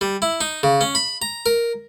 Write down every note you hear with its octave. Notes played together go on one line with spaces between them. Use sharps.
G3
E4
D#4
C#3
C#4
B5
A#5
A#4